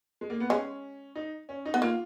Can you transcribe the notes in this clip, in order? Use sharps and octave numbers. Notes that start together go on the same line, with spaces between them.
G#3
A#3
B3
G#3 C#4
D#4
C#4
D#4
B3
A#3 F4